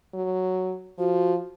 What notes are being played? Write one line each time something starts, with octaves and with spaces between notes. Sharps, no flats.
F#3
F3 F#4